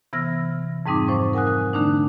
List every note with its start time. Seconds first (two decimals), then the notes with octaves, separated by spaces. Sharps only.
0.13 C3 E3 B3 E6 F6 A#6
0.86 F2 G#2 G3 C4 D#4 D6
1.08 F3 C5 C#6
1.33 A#4 F#5 G#5 D#6 F#6
1.47 F#6
1.73 D3 A3 D4 D#4